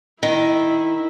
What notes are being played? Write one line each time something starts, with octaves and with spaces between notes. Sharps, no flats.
D#3 E4